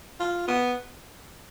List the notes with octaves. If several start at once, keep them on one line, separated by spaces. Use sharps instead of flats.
F4
B3